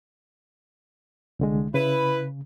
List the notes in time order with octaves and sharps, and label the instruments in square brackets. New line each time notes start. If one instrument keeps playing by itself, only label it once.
[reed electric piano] C2 D3 G#3
[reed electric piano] C#3 [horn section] E4 B4